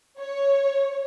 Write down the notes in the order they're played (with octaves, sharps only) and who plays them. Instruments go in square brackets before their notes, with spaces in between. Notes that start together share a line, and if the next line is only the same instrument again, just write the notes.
[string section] C#5